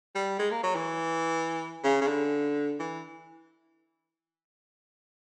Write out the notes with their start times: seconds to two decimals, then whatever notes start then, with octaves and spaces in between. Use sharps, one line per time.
0.15 G3
0.39 G#3
0.51 A#3
0.63 F#3
0.75 E3
1.84 C#3
2.01 C#3
2.07 D3
2.79 E3